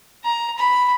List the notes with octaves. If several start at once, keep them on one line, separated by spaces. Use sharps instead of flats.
A#5
B5